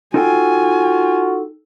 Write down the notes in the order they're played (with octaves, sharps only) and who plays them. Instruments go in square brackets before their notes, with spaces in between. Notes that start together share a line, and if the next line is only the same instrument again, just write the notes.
[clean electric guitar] D#4 A4 G5 [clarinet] F4 [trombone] F#4 [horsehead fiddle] G#5